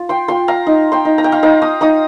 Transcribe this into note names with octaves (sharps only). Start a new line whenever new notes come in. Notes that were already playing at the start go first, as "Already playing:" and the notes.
Already playing: F4
G5 C6
F4 G5 C6
F5 A#5
D#4
G5 C6
D#4
A#5
G5
F5 A#5
D#4 F5 A#5
A#5 D#6
D#4 A#5 D#6